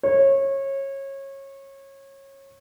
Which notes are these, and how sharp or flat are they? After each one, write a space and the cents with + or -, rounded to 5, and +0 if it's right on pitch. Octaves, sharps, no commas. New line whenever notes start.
C#5 -25